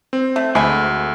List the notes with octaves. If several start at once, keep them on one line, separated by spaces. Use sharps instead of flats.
C4
A3
D2 G#3 G#5 B5